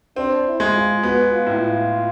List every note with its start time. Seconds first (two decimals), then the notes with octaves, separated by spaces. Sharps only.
0.16 C4 D4
0.45 E4
0.60 G#3
0.74 F4
1.03 B3 F#4
1.32 F4
1.46 A2
1.60 F4